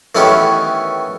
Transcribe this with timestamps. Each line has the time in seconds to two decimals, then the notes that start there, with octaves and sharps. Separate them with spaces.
0.15 D#3 E3 A3 B3 C#4 G4